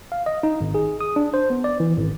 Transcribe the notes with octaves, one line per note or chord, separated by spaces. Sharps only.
F5
D#5
D#4
G#1
G#4
D#6
D4
C5
B3
D5
E3
G#1